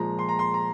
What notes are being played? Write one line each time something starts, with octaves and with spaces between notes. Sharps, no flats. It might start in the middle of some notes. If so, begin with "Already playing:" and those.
Already playing: A#2 F3 G#3 A#5
C6
A#5
C6
A#5